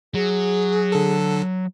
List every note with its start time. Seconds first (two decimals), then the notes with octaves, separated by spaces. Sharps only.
0.14 F#3 G#4
0.92 D3 A4